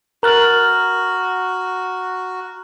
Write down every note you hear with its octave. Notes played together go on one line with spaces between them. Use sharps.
F#4 A#4 A#5 F6 F#6 A6 F#7